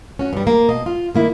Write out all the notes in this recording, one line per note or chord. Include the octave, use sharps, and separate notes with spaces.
C#4 F#4
G2 G3
A#3
B2 D#5
F4
D#3 A#3 E4